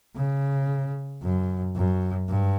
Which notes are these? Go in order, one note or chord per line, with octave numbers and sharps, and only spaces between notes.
C#3
F#2
F#2
G2